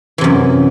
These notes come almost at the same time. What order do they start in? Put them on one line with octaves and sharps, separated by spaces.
E3 C3 F#2